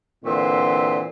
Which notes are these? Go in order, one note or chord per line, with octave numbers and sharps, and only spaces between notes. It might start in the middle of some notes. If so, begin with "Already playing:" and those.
A#2 D3 E3 C4 C6